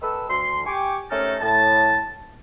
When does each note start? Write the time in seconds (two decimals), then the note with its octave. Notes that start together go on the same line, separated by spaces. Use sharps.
0.02 D#3 A4 B4 E6
0.29 D2 C6
0.66 G4 G5 G#5 C#6 D6
1.11 C3 A3 C#4 D#4 A4 A#4
1.41 A2 A5